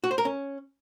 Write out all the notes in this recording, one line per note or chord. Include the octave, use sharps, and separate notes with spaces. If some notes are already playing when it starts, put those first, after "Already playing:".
F#4
C5
A#4
C#4